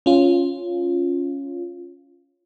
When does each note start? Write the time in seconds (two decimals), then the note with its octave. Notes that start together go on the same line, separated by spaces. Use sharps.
0.06 C#4 F4